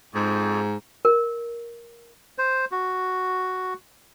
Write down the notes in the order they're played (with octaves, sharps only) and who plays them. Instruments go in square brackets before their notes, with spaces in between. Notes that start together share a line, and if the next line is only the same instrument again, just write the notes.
[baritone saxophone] F2 [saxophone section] G#2
[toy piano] A#4
[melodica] C5
F#4